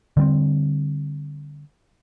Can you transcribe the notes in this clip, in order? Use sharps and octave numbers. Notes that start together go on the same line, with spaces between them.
D3 G3 B3 C4